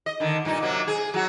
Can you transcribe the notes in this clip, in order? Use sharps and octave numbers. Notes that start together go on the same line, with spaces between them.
D#5
D3 D#3
G2 A#2 D#4
C3 F#3 A#3
G#4
F#3 F#4